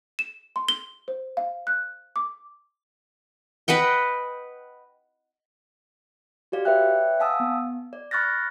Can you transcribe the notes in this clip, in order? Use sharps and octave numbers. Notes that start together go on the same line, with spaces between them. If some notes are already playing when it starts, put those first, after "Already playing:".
E7
C6
G7
C5
F5
F#6
D6
B4 D#5 F#5 G5
F#4 G4 D5 F5
B4 C#5 D5 E5 G5 F#6
F5 F#5 G#5 A5 D#6 E6
B3
D5
B5 C#6 F6 F#6 A6 A#6